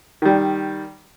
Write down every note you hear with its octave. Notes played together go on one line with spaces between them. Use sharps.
D#3 G3